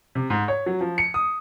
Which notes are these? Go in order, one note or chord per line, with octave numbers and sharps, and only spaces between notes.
C3
G#2
C#5
F#3
F3
C#7
D#6